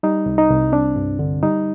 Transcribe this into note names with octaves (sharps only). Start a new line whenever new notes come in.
G3 D#4
C2
D#4
C2
C4 D4
G2
D3
G3 D#4